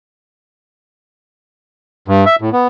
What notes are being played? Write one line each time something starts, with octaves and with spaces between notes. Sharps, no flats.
G2
E5
A2
B3